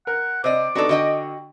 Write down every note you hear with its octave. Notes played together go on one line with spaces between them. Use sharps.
A#4 F#5
C3 C5 D5 D#5 D6
B3 D4 D#4 F#4 A4
D3 F#4 D#5 G5